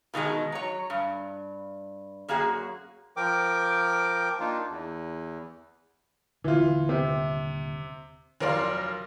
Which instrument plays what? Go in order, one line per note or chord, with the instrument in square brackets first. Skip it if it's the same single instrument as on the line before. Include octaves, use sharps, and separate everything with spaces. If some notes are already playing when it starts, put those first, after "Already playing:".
[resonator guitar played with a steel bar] B2 D#3 G3 G#3
F#3 C#5
G2
F#2 A#3 F#4 G#4
[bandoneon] F3 A#4 G5 D6
A#3 D4 D#4 F4
E2
[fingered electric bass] D#1 D3 [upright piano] E3 F4
[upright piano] C3
[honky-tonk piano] F1 F#3 A#4 D5 F5 C6